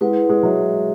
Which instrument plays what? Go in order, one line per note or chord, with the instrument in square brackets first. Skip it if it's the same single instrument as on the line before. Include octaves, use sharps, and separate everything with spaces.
[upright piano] G#3 [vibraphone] E4 B4 F#5
[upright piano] G#3
[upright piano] F#3 [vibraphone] E5